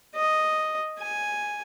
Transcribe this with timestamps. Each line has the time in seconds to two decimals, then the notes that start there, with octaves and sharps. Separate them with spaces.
0.16 D#5
0.99 G#5